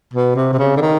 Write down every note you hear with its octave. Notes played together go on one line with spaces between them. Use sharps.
B2
C3
C3
C#3
D3
D#3